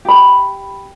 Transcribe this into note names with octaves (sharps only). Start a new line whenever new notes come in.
G4 B5